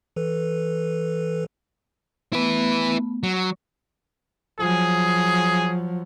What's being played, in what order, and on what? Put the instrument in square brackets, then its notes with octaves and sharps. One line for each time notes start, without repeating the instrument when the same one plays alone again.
[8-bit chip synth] E3 A4 B4
[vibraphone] A3 B3 [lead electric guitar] E4 B4
[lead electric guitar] F#3
[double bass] F3 F#3 [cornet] G#4